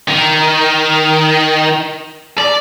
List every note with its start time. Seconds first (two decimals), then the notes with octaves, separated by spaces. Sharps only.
0.08 D#3
2.38 D5